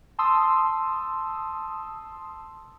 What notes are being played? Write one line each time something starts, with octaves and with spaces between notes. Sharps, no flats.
A5 C6 D#6 E6